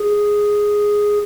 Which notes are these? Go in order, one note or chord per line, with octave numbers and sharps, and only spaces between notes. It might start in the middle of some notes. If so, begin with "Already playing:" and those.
Already playing: G#4